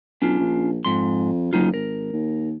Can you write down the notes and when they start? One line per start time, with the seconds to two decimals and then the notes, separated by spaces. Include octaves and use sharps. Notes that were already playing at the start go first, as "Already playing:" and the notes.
0.22 B1 C#4 D4 F4
0.40 A#1
0.85 F2 G#2 C6
1.53 F#1 F#3 D#4 F4
1.74 G#1 A#4
2.13 D#2